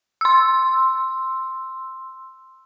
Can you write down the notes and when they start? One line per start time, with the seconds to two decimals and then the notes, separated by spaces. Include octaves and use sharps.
0.21 C6 E6